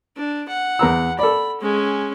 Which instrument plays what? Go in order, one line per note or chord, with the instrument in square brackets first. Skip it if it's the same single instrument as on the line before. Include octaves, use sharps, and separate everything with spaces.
[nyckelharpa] D4
F#5
[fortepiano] E2 A#5 E6
[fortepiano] A4 D5 [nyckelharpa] B5
[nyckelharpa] G#3 C#4